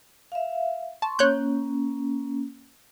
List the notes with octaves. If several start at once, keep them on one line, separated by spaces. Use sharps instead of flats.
E5 F5
A5 C6 C#6
A#3 C#4 C#5 F#6 G6